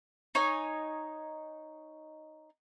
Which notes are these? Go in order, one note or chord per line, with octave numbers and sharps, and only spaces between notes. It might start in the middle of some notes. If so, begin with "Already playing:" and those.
D#4 C#5 G#5